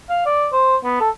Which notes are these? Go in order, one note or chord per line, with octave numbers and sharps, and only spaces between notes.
F5
D5
C5
B3
A4